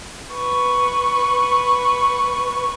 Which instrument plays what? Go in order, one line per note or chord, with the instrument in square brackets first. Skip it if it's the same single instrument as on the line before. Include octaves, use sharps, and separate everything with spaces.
[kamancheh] B4 C#6